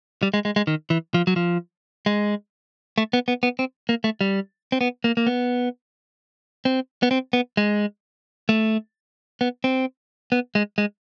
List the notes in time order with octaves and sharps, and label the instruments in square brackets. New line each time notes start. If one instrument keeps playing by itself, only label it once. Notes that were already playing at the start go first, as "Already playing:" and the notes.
[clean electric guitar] G3
G#3
G#3
G#3
D#3
E3
F3
F#3
F3
G#3
A3
B3
B3
B3
C4
A#3
A3
G3
C4
B3
A#3
A#3
B3
C4
B3
C4
B3
G#3
A3
B3
C4
B3
G#3
G#3